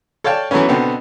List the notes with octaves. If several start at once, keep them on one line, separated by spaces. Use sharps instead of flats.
A4 C#5 D5 F5 G5 A5
E3 F#3 A3 B3 C#4
B2 D3 B3 C4